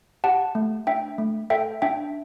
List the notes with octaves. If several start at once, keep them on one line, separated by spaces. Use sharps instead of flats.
G4 F#5 A5
A3
D4 E5 G5
A3
A4 E5 G5
D4 E5 G5